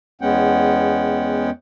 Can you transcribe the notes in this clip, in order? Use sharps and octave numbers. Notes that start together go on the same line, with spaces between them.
E2 G#3 B3 C#4 F#5 G5